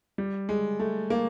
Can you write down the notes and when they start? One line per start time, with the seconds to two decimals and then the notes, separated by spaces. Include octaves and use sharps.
0.18 G3
0.49 G#3
0.79 A3
1.10 A#3